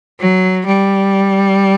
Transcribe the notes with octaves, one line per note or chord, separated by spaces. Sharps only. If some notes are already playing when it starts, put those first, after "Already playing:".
F#3
G3